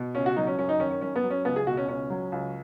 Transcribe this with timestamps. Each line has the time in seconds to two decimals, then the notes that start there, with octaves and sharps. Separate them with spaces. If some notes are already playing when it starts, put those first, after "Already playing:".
Already playing: B2
0.15 C#2 C#4
0.26 F#4
0.36 F#3 D#4
0.47 C#4
0.58 F#2 C#4
0.69 D#4
0.80 D#3 C#4
0.91 C#4
1.01 F#2 C#4
1.16 B3
1.24 F#3
1.30 C#4
1.45 C#2 B3
1.56 G#4
1.67 B2 F#4
1.77 C#4
1.88 C#2 C#4
2.10 F#3
2.32 C#2